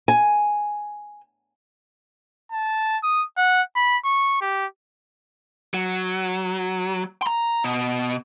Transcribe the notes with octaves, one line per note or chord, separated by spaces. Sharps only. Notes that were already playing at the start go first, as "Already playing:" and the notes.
G#5
A5
D#6
F#5
B5
C#6
G4
F#3
A#5 C6
B2